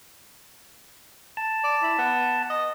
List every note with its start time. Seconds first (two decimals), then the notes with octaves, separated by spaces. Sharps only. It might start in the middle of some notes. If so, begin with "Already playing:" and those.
1.37 A5
1.64 D5
1.83 E4
1.98 B3
2.50 D#5